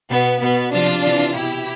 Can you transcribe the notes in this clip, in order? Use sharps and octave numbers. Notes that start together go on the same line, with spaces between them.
B2 B3
B2 B3
C3 F3 D4 F4
C3 E3
B2 E4 G4